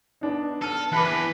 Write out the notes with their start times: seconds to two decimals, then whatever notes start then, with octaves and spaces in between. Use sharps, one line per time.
0.21 B3 D4 D#4
0.62 B3 A4 F6 D#7
0.92 E2 B4 B5 D6 F#6